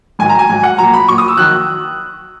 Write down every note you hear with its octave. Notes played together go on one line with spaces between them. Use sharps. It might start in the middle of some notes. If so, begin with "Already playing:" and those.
G#2 D#3 F#3 G#5
A#5
G#5
G#2 F#3 G#5
F#5
A#2 F#3 A#5
B5
A#2 F#3 C#6
D#6
E6
D#3 F#3 F#6